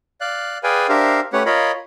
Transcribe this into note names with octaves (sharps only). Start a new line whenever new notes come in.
D5 F5 F#6
G#4 B4 D5 F5 G5 G#5
D4 G4 A#4 C5 E5 F5
A3 C#4 G4 B4 C#5 F#5
F4 A#4 C#5 D#5 F5 B5